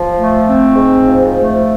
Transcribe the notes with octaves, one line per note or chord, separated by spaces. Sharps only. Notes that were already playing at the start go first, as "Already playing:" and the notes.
Already playing: F3
A3
C4
G#2
F3
A3